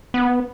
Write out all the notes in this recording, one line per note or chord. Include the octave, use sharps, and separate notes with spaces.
B3